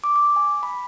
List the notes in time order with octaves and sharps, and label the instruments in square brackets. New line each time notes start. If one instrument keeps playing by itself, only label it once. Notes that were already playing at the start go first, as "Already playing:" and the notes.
[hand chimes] D6
D6
G#5
B5